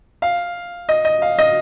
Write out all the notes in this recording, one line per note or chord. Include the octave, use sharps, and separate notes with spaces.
F5
D#5
D#5
F5
D#5